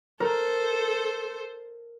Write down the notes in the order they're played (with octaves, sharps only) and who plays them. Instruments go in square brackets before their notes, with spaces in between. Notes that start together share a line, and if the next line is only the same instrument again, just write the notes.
[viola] A4 C5 [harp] A#4